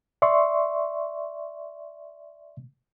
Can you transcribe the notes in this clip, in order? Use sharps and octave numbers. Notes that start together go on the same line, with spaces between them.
D5 E5 C6 C#6